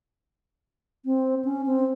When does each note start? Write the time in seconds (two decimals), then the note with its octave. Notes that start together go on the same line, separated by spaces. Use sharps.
1.05 C4
1.45 C#4
1.66 C4